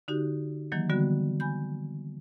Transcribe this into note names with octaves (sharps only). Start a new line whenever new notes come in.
D3 D#4 F#4 G4
D#3 E3 F#3 A#3
D3 G3 B3 F#4
G#5 B5 G6